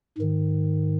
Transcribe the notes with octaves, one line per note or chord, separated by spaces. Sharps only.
G#2 D#3